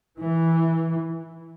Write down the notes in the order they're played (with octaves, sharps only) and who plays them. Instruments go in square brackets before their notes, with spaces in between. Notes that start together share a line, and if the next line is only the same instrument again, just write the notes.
[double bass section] E3